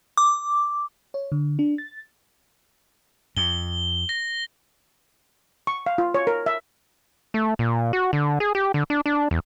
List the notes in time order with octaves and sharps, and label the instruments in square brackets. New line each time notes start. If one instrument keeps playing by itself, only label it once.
[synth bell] D6
[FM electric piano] C#5
D3
D4
A6
[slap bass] F2 [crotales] G7
[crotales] A#6
[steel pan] C#6
F5
F4
C#5
A#4
E5
[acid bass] A3
A#2
F#4
D3
G#4
G4
D3
D4
D4
E2